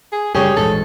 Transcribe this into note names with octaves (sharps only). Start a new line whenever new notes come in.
G#4
F#2 C#3 G3 G4 G#4 C#5
A#1 E2 G#2 A4